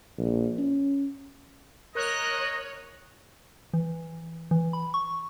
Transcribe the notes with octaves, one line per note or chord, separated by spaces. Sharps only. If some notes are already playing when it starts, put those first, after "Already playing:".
A#1
C#4
A#4 C#5 D#5 F#6
E3
E3
B5
C#6